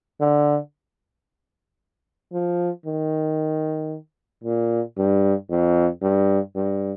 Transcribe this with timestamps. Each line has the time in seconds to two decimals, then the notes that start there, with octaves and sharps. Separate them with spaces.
0.20 D3
2.33 F3
2.86 D#3
4.44 A#2
4.97 G2
5.50 F2
6.02 G2
6.55 G2